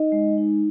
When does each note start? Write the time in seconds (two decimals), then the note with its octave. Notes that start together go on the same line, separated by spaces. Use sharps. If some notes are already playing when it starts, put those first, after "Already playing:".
Already playing: D#4 D#5
0.12 G#3
0.38 D#4